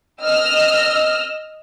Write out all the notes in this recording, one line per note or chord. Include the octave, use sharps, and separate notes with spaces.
D#5 E6 F6